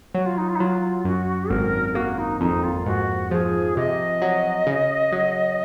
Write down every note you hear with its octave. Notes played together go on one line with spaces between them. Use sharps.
F#3 F#4
F4
D#4
F4
D#4
F#3 F4
F#2 F#4
G#1 A#4
A#3 F#4
D#4
F2 D#4
F4
G#2 F#4
F3 G#4
C3 D#5
F#3
C#3
F#3